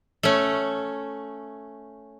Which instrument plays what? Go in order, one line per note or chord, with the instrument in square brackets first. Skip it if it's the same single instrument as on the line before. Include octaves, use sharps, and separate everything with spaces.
[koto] A3 C#4